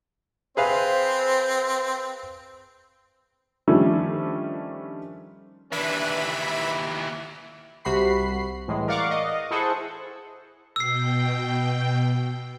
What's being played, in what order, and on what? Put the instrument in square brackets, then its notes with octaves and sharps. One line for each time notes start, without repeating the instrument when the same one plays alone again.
[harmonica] C4 [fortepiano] G#4 B4 F5 [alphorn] C5
[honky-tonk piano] D#3 F3 G3 A3 C#4 D4
[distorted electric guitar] D#2 E3 [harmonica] D4 B4 [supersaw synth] E5 B5
[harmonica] E4
[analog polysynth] C2 C3 F#4 B5 C7
A2 E3 G#3
A#4 D5 F5 F#5 C#6 D6
D#5
E4 G#4 A4 C5 F#5 C#6
[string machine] B2 G5 [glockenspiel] E6 C7